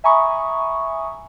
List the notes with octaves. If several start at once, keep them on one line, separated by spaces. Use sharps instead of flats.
E5 G#5 A#5 B5 C#6 D#6